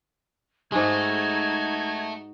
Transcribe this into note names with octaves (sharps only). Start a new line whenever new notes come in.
G#2 G#3 A3 D#4 F#4 G#6